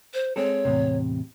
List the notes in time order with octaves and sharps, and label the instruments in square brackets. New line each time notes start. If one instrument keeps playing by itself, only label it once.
[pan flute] C5
[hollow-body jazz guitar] G#3 C4 A4 [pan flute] C#5
[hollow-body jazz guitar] E2 A2 C3